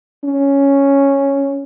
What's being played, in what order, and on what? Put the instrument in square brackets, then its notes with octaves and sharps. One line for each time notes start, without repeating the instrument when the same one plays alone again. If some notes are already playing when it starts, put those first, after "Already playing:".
[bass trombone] C#4